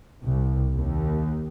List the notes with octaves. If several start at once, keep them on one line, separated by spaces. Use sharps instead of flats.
C2
D#2